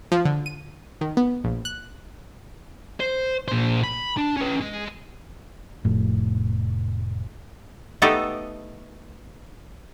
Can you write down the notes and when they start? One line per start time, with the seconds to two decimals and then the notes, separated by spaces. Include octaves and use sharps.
0.12 F3
0.25 D3
0.46 D#7
1.01 D#3
1.17 B3
1.44 A#1
1.65 F#6
3.00 C5
3.48 A#2 C5
3.84 B5
4.17 D4
4.37 C#4 B4
4.61 G#3
5.85 F1 A2
8.02 A3 B3 D#4 G4 A4